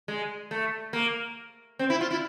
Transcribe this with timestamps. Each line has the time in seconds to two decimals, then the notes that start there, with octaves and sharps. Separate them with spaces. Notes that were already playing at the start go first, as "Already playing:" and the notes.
0.08 G#3
0.51 A3
0.93 A#3
1.79 C4
1.90 E4
2.01 F4
2.11 E4